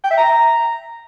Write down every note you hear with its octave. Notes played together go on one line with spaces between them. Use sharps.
G5
E5
A#5